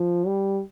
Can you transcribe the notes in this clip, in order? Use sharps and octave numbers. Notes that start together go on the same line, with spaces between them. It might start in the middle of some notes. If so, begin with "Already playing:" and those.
Already playing: F3
G3